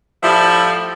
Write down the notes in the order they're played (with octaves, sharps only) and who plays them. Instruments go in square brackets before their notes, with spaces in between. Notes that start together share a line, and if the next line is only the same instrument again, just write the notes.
[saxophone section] A2 F3 G3 E4 E5 F5